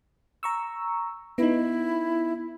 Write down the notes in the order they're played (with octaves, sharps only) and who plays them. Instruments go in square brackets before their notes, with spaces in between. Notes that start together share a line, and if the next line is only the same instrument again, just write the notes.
[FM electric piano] A#5 C#6 E6
[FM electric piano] B3 D#4 [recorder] E4